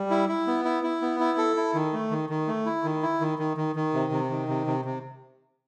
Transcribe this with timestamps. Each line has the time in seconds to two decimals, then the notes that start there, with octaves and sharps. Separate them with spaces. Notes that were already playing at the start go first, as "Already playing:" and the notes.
Already playing: G3
0.10 E4
0.29 E4
0.47 B3
0.65 E4
0.83 E4
1.02 B3
1.20 E4
1.38 A4
1.56 E4
1.74 D#3
1.93 A3
2.11 D#3
2.30 D#3
2.48 A3
2.66 E4
2.84 D#3
3.03 E4
3.21 D#3
3.39 D#3
3.57 D#3
3.76 D#3
3.94 C3
4.12 C3
4.30 D#3
4.48 C3
4.67 C3
4.85 C3